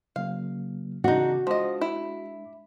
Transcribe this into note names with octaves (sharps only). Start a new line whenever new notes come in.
C#3 F#3 A#3 F5
C#3 E3 D4 D#4 F#4
F3 G#3 D4 D#5 D6
E4